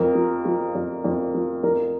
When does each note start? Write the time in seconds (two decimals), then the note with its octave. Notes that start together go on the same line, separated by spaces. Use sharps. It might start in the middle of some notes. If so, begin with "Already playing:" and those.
Already playing: F2 A#4
0.15 F3
0.45 F3
0.74 F2
1.04 F2
1.34 F3
1.63 F2 A#4